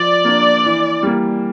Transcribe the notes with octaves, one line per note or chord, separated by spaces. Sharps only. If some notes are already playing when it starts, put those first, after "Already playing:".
Already playing: F3 D5
A#3 D4
E3
G3 A#3